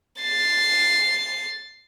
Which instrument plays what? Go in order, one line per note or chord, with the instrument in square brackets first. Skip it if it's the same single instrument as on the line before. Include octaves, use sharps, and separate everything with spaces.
[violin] A6 C7